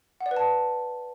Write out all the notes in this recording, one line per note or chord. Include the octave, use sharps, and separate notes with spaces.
F#5
D5
B4
A5